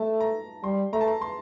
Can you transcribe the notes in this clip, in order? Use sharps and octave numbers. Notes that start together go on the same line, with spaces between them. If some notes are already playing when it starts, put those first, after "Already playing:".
Already playing: A3 A5
A#5
G3 C6
A3 A#5
A5
A#5
C6